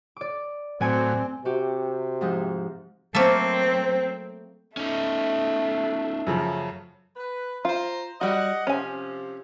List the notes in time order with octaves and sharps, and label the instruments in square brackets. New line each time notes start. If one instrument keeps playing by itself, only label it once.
[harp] D5 D6
[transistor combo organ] A2 F#3 [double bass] C4 [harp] D5 G#5 C#7
[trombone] C3 [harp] F#4 G4
[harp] G#2 F3 D#4
[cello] F#3 C4 [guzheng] A3 A#3 [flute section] C5
[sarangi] A3 [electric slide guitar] C#4 D#4
[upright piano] F#2 C#3 F3
[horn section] B4
[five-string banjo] F4 [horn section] C5 A#5
[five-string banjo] G3 F#4 [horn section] D#5 F#5
[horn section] C3 F3 [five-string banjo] C#4 G#5